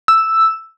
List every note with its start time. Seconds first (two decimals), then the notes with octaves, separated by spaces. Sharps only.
0.08 E6